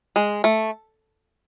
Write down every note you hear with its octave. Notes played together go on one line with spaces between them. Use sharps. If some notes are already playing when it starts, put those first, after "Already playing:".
G#3
A3